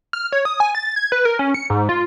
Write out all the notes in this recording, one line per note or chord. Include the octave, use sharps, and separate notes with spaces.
F6
C#5
D#6
G#5
A6
G#6
B4
A#4
C#4
C#7
G#2
F4